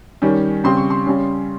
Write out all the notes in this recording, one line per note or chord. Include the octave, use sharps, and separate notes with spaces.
D#3 G3 C#4
C#3 G3 C4 C6
C#6
C6
C#3 G3 C#4